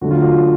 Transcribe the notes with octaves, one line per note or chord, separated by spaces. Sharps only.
D3 F#3 A3 F#4
F4
F#4